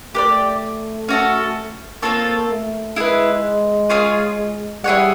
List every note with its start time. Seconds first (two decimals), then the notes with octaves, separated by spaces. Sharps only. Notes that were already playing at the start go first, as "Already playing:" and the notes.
0.14 A3 G4 B4 D5
1.08 C#4 F#4 A4
2.02 A#3 C4 F4 A4 C#5
2.49 A3
2.96 G#3 E4 G#4 B4
3.90 C#4 F4 G#4 C#5
4.84 G3 E4 G#4 C#5 F#5